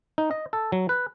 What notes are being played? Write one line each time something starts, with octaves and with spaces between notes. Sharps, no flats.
D#4
D#5
A4
F#3
B4